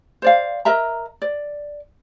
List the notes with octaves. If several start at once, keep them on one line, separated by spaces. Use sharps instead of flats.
C5 D5 F5
A#4 D#5 E5 A#5
D5